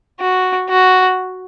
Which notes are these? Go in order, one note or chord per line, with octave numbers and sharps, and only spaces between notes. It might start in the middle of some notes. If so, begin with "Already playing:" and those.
F#4
F#4